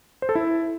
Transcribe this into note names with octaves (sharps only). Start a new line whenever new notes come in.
C5
A4
E4